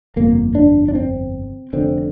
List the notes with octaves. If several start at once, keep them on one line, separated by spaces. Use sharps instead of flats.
G1 F2 C3 A#3
D4
D4
C4
F1 F2 D3 C4